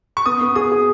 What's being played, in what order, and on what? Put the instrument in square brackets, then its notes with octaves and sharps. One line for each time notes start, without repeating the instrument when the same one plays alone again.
[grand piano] C#6
[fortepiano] B3 [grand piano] D#6
[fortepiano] B3
[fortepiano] G#4 [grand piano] D#6
[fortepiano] G#4